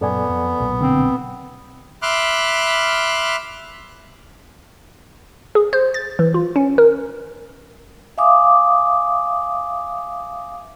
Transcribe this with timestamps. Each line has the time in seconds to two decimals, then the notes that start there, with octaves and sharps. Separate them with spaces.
0.01 F#2 A#2 C#3 B3 A4 D5 G#5
0.29 F2
0.60 B1 G2 A#2
0.81 D3 C4
2.02 E5 B5 C6 D6 F6 F#6
5.55 G#4
5.73 C5
5.94 A6
6.19 E3
6.34 F4
6.56 C#4
6.78 A#4
8.18 E5 F5 G#5 D6 D#6